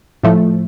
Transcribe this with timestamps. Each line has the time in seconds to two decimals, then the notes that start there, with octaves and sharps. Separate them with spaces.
0.23 A2 F3 A3